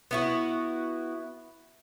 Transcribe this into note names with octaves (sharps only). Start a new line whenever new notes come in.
B3 E4 F#4